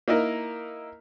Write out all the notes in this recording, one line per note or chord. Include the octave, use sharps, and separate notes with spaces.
A#3 D#4 E4 A#4